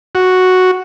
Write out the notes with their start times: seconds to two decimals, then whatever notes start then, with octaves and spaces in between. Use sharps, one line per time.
0.15 F#4